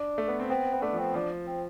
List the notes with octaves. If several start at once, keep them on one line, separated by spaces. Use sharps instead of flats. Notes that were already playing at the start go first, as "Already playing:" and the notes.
Already playing: D4
A3
B3
C4
B3 C4
B3
A3 D4
F3
C4
F3 D4
C4